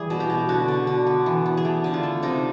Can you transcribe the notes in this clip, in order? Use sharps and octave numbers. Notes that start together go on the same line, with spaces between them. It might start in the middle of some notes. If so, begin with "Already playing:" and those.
Already playing: E3 G3 G#4
B2
G4
B2
D3 F#4
D3
D3
B3
E3
B3
G#4
A3 G4
D3
F4
A3
C3 D#4